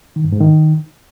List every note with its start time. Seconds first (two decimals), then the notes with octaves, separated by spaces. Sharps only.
0.16 D#3
0.24 G2
0.32 G#2
0.41 D#3